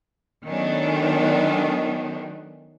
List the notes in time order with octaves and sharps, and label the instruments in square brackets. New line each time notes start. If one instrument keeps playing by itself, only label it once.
[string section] D#3 F#3 A3 B3 C#4 D4